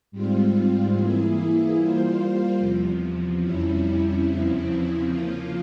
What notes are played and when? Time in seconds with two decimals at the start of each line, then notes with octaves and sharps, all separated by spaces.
0.11 G#2 G3 C4 F4
0.93 E3 A#3 E4 G#4
1.76 G3 A#3 F4 C5
2.58 E2 C3 F3
3.41 F2 C3 G3 C#4 E4
4.23 E2 C#3 F3 C4 E4
5.06 C#3 F3 A#3 F4